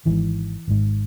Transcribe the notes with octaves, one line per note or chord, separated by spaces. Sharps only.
G#1 G#2 E3
G#1 G#2